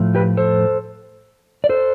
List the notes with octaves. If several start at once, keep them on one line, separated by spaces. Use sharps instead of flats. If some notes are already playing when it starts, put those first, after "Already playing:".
Already playing: A2 F3 A3
G4 B4
A4 C5
D5
A4 C5